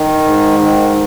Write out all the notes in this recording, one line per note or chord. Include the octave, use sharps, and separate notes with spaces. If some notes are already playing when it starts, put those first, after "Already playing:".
Already playing: D#3
G#2
D#3